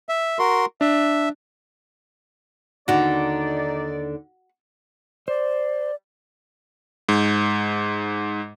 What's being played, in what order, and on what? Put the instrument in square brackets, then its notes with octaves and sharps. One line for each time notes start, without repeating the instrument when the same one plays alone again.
[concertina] E5
F#4 A#4 C6
[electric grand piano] D4 [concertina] E5
[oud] D#2 D3 [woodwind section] D#4 D5 [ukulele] F#4
[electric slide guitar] C5 [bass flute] D5
[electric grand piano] G#2